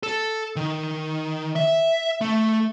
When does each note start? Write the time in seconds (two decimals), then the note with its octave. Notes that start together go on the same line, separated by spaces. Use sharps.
0.03 A4
0.56 D#3
1.56 E5
2.21 A3